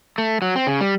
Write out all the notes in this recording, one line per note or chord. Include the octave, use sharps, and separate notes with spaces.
A3
F#3
C4
C#3
G3